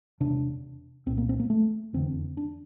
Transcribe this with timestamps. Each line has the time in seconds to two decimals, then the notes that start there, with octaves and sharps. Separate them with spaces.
0.20 E1 E2 C3 D4
1.06 C2 A#2 C4
1.17 A#3
1.29 C4
1.40 A#3
1.50 A3
1.93 F1 E2 D3 C4
2.37 D4